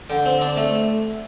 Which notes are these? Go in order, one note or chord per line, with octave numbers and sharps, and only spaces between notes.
D3 G5
C4
D4
A3